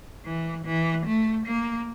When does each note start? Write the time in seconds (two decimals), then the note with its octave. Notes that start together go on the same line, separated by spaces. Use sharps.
0.25 E3
0.65 E3
1.06 A3
1.46 A#3